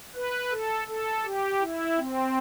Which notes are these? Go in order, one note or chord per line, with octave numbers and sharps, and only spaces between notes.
B4
A4
A4
G4
E4
C4